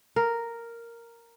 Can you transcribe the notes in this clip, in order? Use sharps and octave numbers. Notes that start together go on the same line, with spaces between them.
A#4